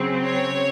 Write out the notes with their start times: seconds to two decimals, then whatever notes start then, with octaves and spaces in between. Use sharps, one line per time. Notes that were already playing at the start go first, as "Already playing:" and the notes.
Already playing: C#3 F#3 C4
0.24 C#5